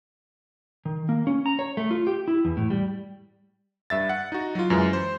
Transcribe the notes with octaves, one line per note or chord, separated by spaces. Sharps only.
D#3
A#3
C#4
A#5
C#5
A3
F4
G4
E4
E2
A2
G3
G2 E5 A6
F#5
D#4 F#4
F#3 F4
F#2 E3 G#3
C5